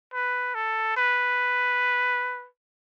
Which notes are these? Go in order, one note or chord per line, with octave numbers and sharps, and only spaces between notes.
B4
A4
B4